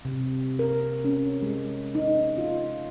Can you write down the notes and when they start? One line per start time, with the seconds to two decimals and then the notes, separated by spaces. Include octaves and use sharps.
0.05 C3
0.59 A#4
1.05 C#4
1.42 G#3
1.95 D#4
2.38 F4